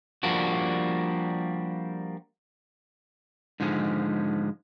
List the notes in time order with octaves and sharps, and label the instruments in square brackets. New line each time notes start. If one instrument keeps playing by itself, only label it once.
[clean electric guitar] F3 G3 A#3 D4 F#4
G#2 D3 F3 G#3